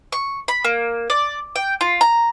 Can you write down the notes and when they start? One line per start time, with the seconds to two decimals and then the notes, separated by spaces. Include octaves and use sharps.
0.13 C#6
0.48 B5
0.64 A#3
1.10 D5
1.56 G5
1.81 F4
2.01 A#5